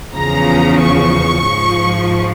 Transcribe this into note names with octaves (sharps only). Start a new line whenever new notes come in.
E2 C#3 F3 A#5
C#6
G#2 F3